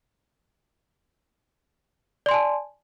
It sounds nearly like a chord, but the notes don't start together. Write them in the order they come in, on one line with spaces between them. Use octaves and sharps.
D5 C6 G#5 A5